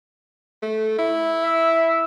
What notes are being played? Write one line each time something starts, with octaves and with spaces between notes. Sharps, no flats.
A3
E4
E5